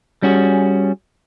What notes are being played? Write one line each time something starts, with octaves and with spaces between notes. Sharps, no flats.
G3 C#4 F#4 G#4